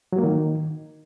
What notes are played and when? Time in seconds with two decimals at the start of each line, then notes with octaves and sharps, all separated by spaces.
0.12 F#3
0.18 A#3
0.24 D#3